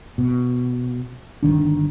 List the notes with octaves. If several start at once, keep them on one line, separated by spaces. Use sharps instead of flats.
B2
G1 C2 D#3 D4